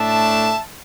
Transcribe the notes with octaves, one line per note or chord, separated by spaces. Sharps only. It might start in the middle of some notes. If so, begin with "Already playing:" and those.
Already playing: A2 A3 D4 E5 A5